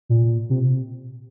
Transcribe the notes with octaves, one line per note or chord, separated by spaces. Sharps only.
A#2
C3